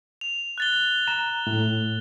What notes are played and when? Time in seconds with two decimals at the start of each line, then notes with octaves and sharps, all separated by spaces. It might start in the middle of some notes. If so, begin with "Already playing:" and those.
0.21 F7
0.58 F#6 A6 G7
1.08 A#5 E7
1.47 A2